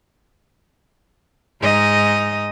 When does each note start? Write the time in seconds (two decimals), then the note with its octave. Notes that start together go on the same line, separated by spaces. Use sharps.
1.62 G#2 D#4 D#5